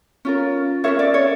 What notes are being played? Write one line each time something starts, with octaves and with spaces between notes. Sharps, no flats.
C#4 F4 A#4
C#4 F4 A#4 C#5 E5
D5
C#5